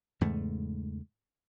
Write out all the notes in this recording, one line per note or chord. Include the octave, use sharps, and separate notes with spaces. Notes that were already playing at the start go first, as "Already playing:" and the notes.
E2 G#2 C#3 A3